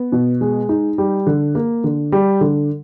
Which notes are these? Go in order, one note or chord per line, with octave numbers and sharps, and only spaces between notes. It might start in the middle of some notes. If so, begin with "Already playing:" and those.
Already playing: B3
B2
G#3
D#4
G3
D3
A#3
D3
G3
D3